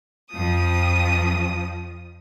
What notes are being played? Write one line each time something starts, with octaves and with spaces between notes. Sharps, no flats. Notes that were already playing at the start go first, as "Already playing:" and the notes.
F2 F3 D#6